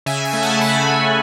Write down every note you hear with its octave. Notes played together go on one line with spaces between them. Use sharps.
C#3 E5 G#5
E5 G#5
A3
F#5 A5
C#3 G#5 B5
C#3